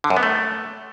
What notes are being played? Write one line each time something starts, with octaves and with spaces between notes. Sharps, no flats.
D3
F#2
B3
A3